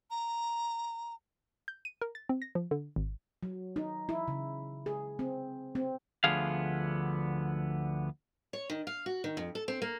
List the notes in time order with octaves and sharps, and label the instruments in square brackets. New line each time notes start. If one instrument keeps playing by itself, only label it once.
[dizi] A#5
[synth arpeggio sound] G6
D#7
A#4
A6
C4
A#6
F3
D3
G#1
[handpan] F#3
D#4
E4
C#3
G#4
C4
C4
[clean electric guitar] D2 D3 F3 B3 G#4 F5
[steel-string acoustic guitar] C#5
D#3
F5
F#4
D#3
F2
A4
C4
A#3